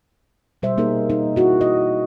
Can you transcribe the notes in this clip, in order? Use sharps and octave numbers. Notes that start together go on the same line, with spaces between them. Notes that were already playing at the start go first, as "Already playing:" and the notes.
B2 G3 C5 E5
A#3 D#4 G#4 A#4
D#4
E4 F#4
D#5